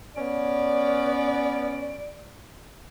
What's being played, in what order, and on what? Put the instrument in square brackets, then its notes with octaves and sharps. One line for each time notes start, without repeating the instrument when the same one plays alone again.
[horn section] B3 C#4 [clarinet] D5